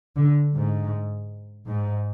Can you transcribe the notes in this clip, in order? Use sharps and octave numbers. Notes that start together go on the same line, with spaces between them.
D3
G#2
G#2